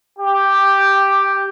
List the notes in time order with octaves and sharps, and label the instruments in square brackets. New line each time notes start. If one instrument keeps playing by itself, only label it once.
[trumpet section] G4